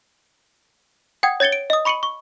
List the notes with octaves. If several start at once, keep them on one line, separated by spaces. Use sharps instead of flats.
F#5 G5 D#6 G#6
C#5 G#6 A6 C#7 G7
D7
D#5 D#6
B5 C#6 C#7 D#7 F#7
C#6